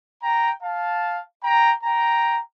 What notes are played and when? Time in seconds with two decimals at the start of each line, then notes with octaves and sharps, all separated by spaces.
0.23 G5 A#5
0.63 F5 A5
1.44 G5 A#5
1.84 G5 A#5